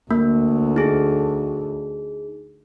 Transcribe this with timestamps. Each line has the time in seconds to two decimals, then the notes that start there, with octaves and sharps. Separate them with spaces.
0.11 D2 A#3
0.76 D#4 G#4